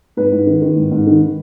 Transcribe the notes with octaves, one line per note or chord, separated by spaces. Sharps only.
G#2 B4
G#2
D#3
D#3
G#2
G#2
D#3
D#3